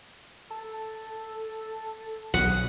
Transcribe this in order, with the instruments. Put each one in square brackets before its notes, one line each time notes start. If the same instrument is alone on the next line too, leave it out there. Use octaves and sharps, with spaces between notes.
[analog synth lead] A4
[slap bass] B1 [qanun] F#5 [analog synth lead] D#6